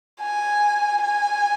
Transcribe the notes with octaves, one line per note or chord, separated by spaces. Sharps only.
G#5
G#5